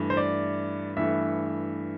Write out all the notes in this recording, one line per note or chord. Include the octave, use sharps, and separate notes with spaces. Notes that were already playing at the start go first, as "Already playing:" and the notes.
Already playing: G2 E3 A3
C5
D5
G2 E3 A3 E5